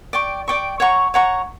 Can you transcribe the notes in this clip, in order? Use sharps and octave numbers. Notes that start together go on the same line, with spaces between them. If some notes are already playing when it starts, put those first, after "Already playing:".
D5 G5 C#6
D5 G5 C#6
C#5 F#5 A#5 C#6
C#5 F#5 A#5 C#6